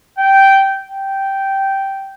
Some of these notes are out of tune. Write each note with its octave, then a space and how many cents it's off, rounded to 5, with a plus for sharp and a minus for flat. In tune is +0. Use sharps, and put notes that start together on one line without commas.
G5 -10
G5 -10